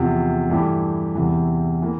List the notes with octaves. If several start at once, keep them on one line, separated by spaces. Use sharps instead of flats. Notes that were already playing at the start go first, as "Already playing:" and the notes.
Already playing: E2 C3 F3
G2 E3 A3 E4 G4
E2 C3 E3
E3 A#3